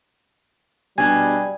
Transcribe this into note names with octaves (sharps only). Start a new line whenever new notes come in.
B2 G3 D4 G#5